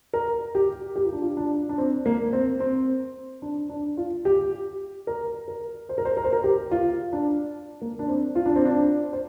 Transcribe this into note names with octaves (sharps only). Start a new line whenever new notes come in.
A#4
G4
G4
F4
D4
F4
D4
D4
C4
A#3
C4
C4
D4
D4
F4
G4
A#4
A#4
C5
A#4
C5
A#4
C5
A#4
G4
F4
D4
A#3
D4
C4
F4
D4
C4
D4
C5